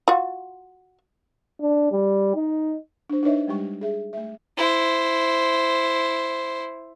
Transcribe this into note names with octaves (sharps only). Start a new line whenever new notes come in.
F4 F#4
D4
G3
D#4
D4 C5
D4 D#4 B4 C#5 D#5 E5
G3 G#3 G4 C#6
G#4 E5
A3 E5
E4 C5